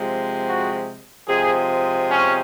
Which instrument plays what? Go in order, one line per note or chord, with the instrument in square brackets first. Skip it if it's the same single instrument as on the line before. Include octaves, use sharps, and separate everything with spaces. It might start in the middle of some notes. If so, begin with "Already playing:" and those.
Already playing: [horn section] C3 F3 G#3
F#4
C3 F3 G#3 G#4
C#4